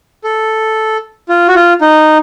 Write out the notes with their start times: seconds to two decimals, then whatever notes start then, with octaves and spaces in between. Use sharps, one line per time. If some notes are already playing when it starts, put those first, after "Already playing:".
0.24 A4
1.29 F4
1.48 F#4
1.55 F4
1.81 D#4